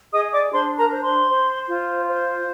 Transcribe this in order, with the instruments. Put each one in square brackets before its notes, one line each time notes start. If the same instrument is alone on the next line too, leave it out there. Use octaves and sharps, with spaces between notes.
[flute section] G#4 D#5 D#6
D5 D6
D4 C5 C6
A#4 A#5
C5
C5 C6
C5
F4
C5